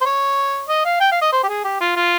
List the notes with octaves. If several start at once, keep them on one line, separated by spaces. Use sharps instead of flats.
C5
C#5
D#5
F5
G5
F5
D#5
C5
G4
G#4
G4
F4
F4